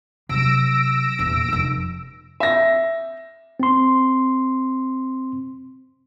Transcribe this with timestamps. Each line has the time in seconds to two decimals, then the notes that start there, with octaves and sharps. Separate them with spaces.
0.29 C3 F#3 E6 A#6 D7
1.19 E2 A#2
1.49 F1 F2
2.40 E5 A#6
3.60 C4 C6